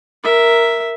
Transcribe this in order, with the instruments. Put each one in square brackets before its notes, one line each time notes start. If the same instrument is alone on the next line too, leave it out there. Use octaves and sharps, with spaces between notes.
[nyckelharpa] A#4 E5